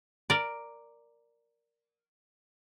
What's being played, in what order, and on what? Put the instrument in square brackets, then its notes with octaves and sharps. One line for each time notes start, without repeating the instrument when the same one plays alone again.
[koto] A#4 D5